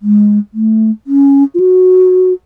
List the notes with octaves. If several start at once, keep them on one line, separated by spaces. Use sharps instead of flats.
G#3
A3
C#4
F4
F#4